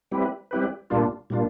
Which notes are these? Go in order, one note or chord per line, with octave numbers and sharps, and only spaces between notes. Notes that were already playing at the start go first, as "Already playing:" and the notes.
G3 C4 E4 G4 B4
G3 C4 E4 G4 B4
A#2 G3 A#3 D4 F4
A#2 G3 A#3 D4 F4